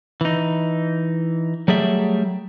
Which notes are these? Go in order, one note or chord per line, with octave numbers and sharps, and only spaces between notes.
E3 D#4
F#3 G3 A3 G#4 D5 E5